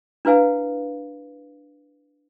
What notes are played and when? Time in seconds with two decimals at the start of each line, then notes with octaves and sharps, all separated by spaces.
0.25 D4 E4 B4 F5 G#5